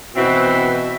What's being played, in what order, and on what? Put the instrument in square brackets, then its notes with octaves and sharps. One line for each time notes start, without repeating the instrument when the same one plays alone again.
[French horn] B2 [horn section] E3 C4 [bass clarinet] F#4 [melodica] E5